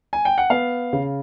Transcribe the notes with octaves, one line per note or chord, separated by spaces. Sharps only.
G#5
G5
F#5
B3 F5
C#3